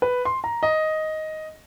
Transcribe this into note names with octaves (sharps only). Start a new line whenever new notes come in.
B4
C6
A#5
D#5